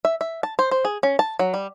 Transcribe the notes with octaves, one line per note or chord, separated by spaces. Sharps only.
E5
E5
A5
C5
C5
G#4
C#4
A5
F#3
G3